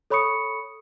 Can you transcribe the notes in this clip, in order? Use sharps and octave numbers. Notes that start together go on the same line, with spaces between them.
A4 C#5 B5 C#6 D#6 C#7